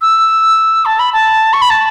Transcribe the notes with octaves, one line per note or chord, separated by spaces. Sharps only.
E6
A5
B5
A5
C#6
B5
A5